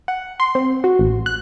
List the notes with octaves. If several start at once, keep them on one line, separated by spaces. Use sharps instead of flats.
F#5
C6
C4
F#4
A1
F#6